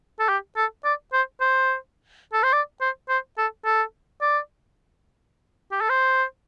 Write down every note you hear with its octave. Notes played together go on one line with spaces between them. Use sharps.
A4
G4
A4
D5
C5
C5
A4
C5
D5
C5
C5
A4
A4
D5
G4
A4
C5